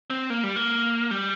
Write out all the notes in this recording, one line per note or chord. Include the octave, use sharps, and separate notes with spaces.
C4
A#3
G3
A#3
G3